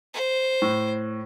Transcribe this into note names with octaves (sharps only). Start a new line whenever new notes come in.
C5
A2